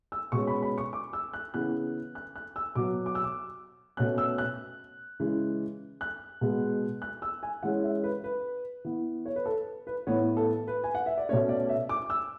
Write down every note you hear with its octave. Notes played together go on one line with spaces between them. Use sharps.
E6
B2 G#3 C#4 C#6
B5
B5
C#6
D6
E6
F#6
C#3 E3 B3 F#6
F#6
F#6
E6
B2 F#3 B3 D6
D6
E6
D6
B2 A3 C#4 F#6
E6
F#6
C#3 E3 G#3
F#6
B2 G#3 B3
F#6
E6
G#5
E3 G#3 C#4 F#5
E5
B4
B4
E3 B3
C#5
B4
A4
B4
A2 E3 B3 C#5
A4
B4
G#5
F#5
E5
D5
B2 A3 C#4 C#5
D5
E5
D6
E6